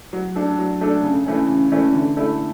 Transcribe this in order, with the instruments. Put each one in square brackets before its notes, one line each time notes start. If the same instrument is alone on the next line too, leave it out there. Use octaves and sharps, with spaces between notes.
[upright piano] F#3
A3 D4 A4
F#3
A3 D4 A4
C#3
E3 A3 C#4
C#3
E3 A3 C#4
D3
A3 E4 A4